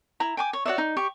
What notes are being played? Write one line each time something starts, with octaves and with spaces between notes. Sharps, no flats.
E4 A#5
G5 G#5 D6
C#5
F#4 C#5 D5 E5
D#4
G4 C#6